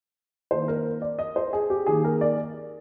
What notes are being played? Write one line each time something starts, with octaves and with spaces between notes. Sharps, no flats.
D#3 A#3 C5
A#4
D5
D#5
C5
G#4
G4
D#3 A#3 G#4
A#4
D5